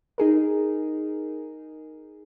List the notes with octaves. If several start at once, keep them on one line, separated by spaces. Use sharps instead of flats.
D#4 G#4 A#4